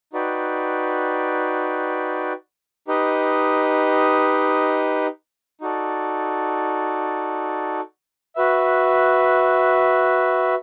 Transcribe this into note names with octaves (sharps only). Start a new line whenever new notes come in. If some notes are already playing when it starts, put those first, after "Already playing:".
D#4 F#4 B4 D5 G5
D#4 G4 B4 D#5
D#4 F#4 A4 D5
F#4 B4 E5